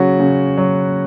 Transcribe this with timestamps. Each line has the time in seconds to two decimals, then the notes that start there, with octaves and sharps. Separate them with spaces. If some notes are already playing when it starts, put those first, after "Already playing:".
Already playing: C#3 F#3 F#4
0.19 C#3
0.57 F#3